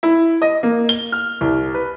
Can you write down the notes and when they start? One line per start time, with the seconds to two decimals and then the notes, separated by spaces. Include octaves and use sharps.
0.03 E4
0.42 D#5
0.63 A#3
0.89 G7
1.12 F6
1.41 C2
1.74 B4